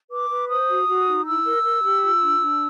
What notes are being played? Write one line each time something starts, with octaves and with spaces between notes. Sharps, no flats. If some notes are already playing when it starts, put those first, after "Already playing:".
B4 D6
B4
C5 D#6
F#4
F#4
D#4
E4 E6
A#4
A#4
G4
F4
D4
D4